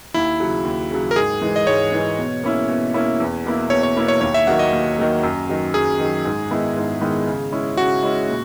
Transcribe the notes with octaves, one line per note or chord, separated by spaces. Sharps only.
D#2 E4
C#3 F#3
D#2
C#3 F#3
A#4
G#2 G#4
E3 G#3
D#5
G#2 C#5
E3 G#3
B2
A#3 C#4 E4
B2
A#3 C#4 E4
E2
B2 A#3 E4
E2 C#5
C#5
B2 A#3 E4
C#5
D#2 C#5
E5
D#3 F#3 A#3 F#5
D#5
D#2
D#3 F#3 A#3
F#2
D#3 F#3
F#2 G#4
D#3 F#3
G#2
D#3 G#3 B3 E4
G#2
D#3 G#3 B3 E4
C#3
G#3 C#4 E4
C#3 F#4
G#3 C#4 E4
A#2